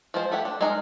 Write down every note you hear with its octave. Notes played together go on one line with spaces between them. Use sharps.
F3 G#3 C5
A3 E4 G4 F#5
D4
G#3 D#4 A#4